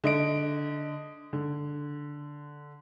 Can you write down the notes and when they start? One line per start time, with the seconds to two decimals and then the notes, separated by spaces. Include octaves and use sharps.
0.04 D3 D#5 D7
1.33 D3